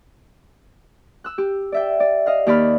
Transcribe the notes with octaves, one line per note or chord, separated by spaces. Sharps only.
E6 F#6
G4
D5 E5 G5
D5
D#5 F5 F6
D#2 G4 D5 B5 F6